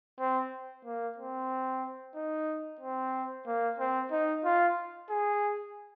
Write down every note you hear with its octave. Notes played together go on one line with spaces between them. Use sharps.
C4
A#3
C4
D#4
C4
A#3
C4
D#4
F4
G#4